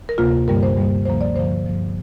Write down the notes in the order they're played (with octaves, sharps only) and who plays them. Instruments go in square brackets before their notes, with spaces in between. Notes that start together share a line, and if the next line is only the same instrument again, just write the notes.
[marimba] A#4
D2 C3 A#3 F4
G2 D3 G3 A#3 A#4
C5
G2 G3 A#3
D2 C3 F3 A#3 C5
D5
G2 D3 F3 C5
G2 F3 A#3